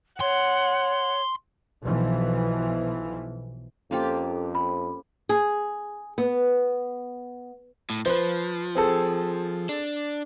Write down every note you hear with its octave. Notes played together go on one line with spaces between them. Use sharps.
C#5 F#5 C6
B1 B2 E3 F3
F2 A#3 C#4 F4 G4 A4 C5
B5
G#4
B3
A2
F3 B4 C5
C4 G#4 A4
D4